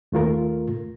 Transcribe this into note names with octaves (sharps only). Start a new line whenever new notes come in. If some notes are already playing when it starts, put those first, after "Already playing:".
D#2 A3 F4 A#4